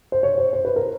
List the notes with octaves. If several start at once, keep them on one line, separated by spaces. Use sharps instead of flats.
C5
C#5
C5
C5
B4
A#4